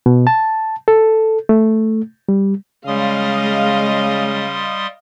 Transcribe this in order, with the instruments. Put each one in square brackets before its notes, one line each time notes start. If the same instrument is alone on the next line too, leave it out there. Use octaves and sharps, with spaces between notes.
[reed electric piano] B2
A5
A4
A3
G3
[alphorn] C#3 [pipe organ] G3 C6 D#6 [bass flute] G#3 [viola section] D#5 F5